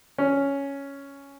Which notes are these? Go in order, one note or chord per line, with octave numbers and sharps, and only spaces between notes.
C#4